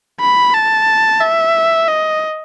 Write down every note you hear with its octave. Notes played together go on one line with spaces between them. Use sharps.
B5
A5
E5
D#5